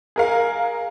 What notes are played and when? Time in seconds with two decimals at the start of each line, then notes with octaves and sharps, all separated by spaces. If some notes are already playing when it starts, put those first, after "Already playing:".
0.16 G#4 A#4 F5